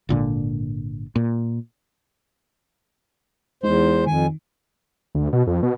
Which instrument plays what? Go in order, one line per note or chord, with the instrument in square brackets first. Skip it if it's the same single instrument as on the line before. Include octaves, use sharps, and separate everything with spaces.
[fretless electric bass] G#1 A#2 D3
A#2
[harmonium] E2 C5 [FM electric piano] G#3 D#4
[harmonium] F2 G#5 [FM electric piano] D#3
[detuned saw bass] D2
B2
F2
B2